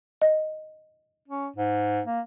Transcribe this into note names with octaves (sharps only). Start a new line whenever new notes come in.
D#5
C#4
G#2
A#3